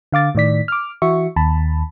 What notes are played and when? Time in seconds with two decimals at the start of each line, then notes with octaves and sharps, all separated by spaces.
0.12 D3 F5 D6 A6
0.35 A2 D#3 D5 B6
0.68 D6 F6
1.02 E3 F#4 E5 C#6
1.36 D#2 A5 B5